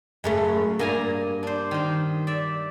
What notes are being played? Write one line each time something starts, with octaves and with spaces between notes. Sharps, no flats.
F#2 C#3 A3
G2 A#3 G#5 A#5
D4 C5
D#3 C5
D5 E5